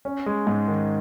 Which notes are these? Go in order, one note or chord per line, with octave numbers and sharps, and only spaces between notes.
C#4
G#3
G#2
D#3